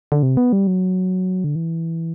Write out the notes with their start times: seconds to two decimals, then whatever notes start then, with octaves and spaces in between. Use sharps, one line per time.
0.12 D3
0.23 C3
0.37 B3
0.53 G3
0.67 F#3
1.44 D3
1.56 E3